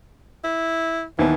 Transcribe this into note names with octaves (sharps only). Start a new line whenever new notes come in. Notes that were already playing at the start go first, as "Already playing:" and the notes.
E4
D#2 E3 B3